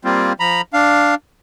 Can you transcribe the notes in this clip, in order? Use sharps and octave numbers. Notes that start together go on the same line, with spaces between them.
G3 A#3 C4 F4
F3 A#5 B5
D4 F5